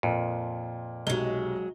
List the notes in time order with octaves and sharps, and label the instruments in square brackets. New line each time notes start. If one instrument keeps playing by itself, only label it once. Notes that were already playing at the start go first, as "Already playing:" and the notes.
[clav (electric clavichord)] F2 [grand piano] A#2
[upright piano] B1 C3 [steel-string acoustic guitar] F#3 G#3 [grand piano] G7